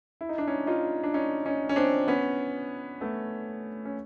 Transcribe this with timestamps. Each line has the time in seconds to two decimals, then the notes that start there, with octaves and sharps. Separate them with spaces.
0.21 E4
0.29 D#4
0.38 D4
0.47 C#4 D#4
0.67 D#4 F4
1.03 D4
1.14 C#4 D#4
1.46 C#4 D#4
1.69 C#4
1.76 C4 D4
2.08 B3 C#4
3.01 A3 B3
3.85 C#4